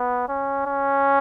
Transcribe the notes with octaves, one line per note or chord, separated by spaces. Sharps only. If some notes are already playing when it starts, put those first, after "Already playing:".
Already playing: B3
C#4
C#4